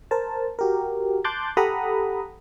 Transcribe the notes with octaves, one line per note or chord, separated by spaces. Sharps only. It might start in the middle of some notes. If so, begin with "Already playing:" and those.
A#4 C5 A5
F#4 G4 A#4
A5 C6 D6 F#6 G6 A6
G4 A4 F#5 A#5 B5 D#6